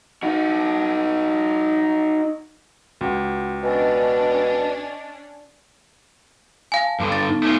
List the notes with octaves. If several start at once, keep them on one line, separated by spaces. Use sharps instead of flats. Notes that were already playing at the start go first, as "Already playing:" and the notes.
D#4 F#4
C#2 F#4 F#5
B2 C#4 D4 D#5 G#5 A6
F5 G#5
A5
G2 D3
A6
B3 D#4
A3 C#4 F4